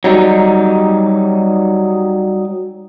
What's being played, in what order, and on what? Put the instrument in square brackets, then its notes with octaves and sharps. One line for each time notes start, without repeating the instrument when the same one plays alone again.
[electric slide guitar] F#3 G3 D#4